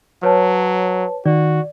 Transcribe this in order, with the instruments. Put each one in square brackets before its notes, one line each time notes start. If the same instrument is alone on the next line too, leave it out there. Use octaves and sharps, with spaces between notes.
[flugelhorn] F#3 [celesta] B4 C#5 A5
[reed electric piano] D#3 [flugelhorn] F#4 [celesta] D5